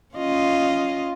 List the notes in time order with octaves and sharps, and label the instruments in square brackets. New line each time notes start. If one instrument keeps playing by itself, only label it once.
[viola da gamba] C#4 F4 D#5